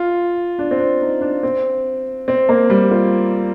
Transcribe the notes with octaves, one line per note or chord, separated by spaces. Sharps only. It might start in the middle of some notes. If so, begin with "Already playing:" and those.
Already playing: F4
D4
C4
D4
D#4
D4
C4
C4
A#3
G3
F4